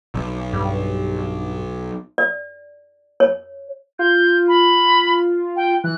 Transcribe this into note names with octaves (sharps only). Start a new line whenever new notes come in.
B1
G2
D5
C#5
F4 G6
B5
G5
E3 F#6